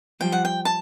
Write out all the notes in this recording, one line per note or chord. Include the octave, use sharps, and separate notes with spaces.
F3 G3 G5
F#5
G5
A5